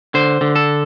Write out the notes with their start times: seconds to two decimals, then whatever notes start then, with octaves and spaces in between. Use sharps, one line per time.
0.14 D3 C5
0.41 D3
0.56 A4